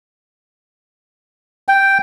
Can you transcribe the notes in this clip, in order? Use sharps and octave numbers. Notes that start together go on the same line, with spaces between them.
G5